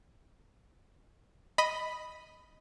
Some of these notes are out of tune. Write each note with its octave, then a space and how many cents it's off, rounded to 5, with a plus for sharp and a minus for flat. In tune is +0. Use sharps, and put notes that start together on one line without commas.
D#5 +5 B5 +5